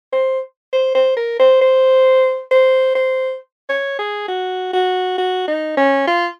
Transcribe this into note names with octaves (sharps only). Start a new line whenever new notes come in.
C5
C5
C5
A#4
C5
C5
C5
C5
C#5
G#4
F#4
F#4
F#4
D#4
C#4
F4